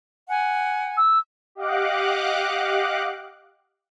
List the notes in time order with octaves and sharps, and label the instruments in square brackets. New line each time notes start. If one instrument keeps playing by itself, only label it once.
[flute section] F#5 G#5
[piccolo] E6
[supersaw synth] G4 D#5 F5 F#5 D6 F#6